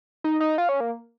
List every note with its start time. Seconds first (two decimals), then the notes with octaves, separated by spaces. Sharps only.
0.24 D#4
0.40 D#4
0.58 F4
0.69 C#4
0.80 A#3